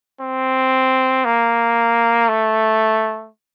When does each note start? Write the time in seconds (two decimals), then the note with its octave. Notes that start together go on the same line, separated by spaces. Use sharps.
0.20 C4
1.25 A#3
2.29 A3